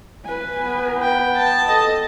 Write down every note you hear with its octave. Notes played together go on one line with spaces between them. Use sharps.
B4 G#5
B3
G5
A5
A4 D#5